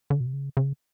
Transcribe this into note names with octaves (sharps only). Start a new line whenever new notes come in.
D3
B2
C3
C#3
C#3